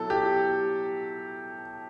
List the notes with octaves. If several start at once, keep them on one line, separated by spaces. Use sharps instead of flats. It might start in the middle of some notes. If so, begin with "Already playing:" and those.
Already playing: B2 F#3 E4 A4
G4